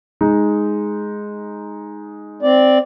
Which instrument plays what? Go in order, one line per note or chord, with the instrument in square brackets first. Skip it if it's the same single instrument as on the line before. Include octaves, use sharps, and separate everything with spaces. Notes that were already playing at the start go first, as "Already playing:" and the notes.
[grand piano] G#3 D#4
[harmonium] C4 D5